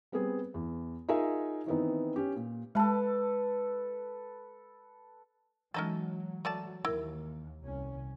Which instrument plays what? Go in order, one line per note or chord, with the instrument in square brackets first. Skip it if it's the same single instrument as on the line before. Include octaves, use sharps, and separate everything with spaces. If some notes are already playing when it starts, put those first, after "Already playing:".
[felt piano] G3 B3 C4 G#4
E2
D#4 F4 G#4 A#4 E5 G#5
D#3 E3 B3 C4 D#4
C#4 G4
A#2
[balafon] G#3 A5 [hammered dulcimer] A4 B4
[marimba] E3 G#3 [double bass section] F#3 [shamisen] C#4 D#4 A4
[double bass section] F#3 [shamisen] A3 D5 A5
[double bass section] D#2 [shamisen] E4 [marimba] A#4
[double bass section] C2 C#4